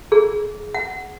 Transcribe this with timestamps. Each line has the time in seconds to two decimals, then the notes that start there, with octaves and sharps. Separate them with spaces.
0.12 G#4
0.74 F#5